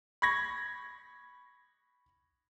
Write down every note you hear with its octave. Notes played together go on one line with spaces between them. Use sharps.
B5 C#6 G#6 A#6